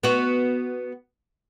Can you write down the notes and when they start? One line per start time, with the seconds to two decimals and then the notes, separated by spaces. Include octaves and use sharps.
0.03 B3 F#4